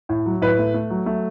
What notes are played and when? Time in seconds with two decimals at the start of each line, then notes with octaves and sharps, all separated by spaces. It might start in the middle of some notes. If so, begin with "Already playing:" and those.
0.09 A2
0.26 F#3
0.42 A2 B4
0.59 A3
0.74 A3
0.90 F#3
1.06 A3